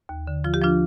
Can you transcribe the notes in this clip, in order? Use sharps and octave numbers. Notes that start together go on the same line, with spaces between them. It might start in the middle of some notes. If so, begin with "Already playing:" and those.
D#2
D3
F3 F4
G4
F3 D4 F4